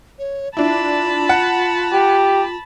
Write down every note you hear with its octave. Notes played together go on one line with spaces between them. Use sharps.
C#5
D4 E4 F4 A5 B5
F#5
G4